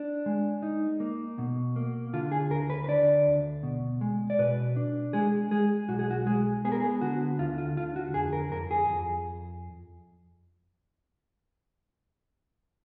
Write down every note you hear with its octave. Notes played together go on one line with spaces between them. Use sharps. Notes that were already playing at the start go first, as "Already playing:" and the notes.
Already playing: D4
G#3
D#4
A#3
B2
A#3
D3 F4
G#4
D2 A#4
B4
B4
D3 D5
D2
B2
G#3
D5
B2 B4
D4
G#3 G#4
G#3 G#4
B1 F#4
G#4
F#4
G#3 G#4
B3 G#4
A#4
G#4
D3 F#4
D2 F4
F4
D3 F4
F#4
F2 G#4
A#4
F2 A#4
G#4
F2